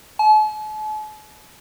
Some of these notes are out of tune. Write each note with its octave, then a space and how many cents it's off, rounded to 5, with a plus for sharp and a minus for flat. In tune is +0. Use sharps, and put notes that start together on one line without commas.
A5 -45